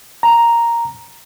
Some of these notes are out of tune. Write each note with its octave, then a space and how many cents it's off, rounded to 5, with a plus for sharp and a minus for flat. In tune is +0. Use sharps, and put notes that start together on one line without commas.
A#5 +0